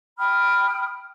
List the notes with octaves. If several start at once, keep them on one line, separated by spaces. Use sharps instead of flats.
G5 B5 D#6 F6